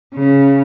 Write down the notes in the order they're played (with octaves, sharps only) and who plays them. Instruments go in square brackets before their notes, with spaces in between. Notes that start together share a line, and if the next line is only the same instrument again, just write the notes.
[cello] C#3